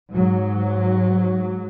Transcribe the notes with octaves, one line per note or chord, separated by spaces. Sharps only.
G#2 F#3